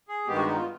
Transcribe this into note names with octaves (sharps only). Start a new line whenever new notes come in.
G#4
G2 D#3 G#3 B3 G4
F#4
D#4
F4